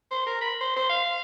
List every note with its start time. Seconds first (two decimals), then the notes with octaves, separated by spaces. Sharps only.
0.11 C5
0.27 A#4
0.41 B5
0.61 C5
0.76 C5
0.89 F5